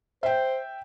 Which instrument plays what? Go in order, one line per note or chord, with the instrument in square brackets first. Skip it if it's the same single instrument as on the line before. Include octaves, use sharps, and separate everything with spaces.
[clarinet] C5 [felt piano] E5 G5